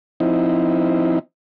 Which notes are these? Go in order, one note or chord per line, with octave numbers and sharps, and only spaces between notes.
F3 C4 D#4 E4